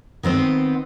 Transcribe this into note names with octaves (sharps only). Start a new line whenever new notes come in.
D#3 B3 C4 C5